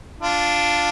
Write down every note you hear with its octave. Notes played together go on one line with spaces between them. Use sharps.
D4 F4